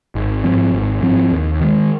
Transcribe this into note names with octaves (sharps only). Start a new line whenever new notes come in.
G#1
G#2 F3 C4
G#1
G#2 F3 C4
D#2
D#3 G#3